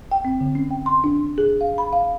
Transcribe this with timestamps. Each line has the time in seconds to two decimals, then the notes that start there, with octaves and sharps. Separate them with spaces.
0.12 G5
0.25 C4
0.40 D3
0.55 C#4
0.71 G5
0.86 C6
1.04 D4
1.38 G#4
1.61 F5
1.78 B5
1.93 F5